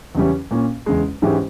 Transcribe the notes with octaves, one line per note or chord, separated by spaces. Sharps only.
E2 C#3 E3 G3 C#4
A#2 A#3 C#4
E2 C#3 G#3
G#2 E3 G#3 C#4 G4